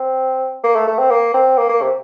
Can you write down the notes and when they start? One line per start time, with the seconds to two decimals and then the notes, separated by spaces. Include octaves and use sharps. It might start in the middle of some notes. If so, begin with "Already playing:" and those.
Already playing: C4
0.63 A#3
0.75 A3
0.87 A3
0.98 C4
1.10 A#3
1.34 C4
1.58 A#3
1.69 A#3
1.81 C3